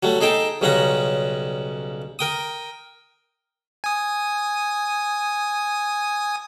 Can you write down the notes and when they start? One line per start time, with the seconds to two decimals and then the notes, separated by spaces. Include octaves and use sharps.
0.03 F#3 G3 A3
0.21 D#4 G#4 A4 G5 A5
0.61 B1 C#3 G3 C#4 F#5 A#5
2.19 A#4 G5 D#6
3.84 G#5 D#6